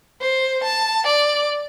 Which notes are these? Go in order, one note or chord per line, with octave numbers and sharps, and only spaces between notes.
C5
A5
D5